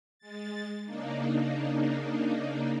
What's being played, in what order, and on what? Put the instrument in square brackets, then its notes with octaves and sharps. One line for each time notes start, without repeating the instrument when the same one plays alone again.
[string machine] G#3 A6
C#3 A#3 D4 D#4